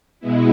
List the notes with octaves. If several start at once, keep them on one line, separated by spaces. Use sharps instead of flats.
B2 G#3 B3 E4